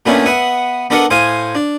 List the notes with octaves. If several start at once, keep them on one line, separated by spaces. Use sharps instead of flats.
A#2 A3 B3 C#4 D4 E4
B3 E5 F#5 D#6
B3 D4 A4 A#4 D#5 F#5
A2 C5 F5 G#5 D#6
D4